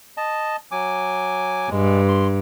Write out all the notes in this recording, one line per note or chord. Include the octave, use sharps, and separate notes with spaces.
D#5 A5
F#3 G#5 D6
G2 G#3
C6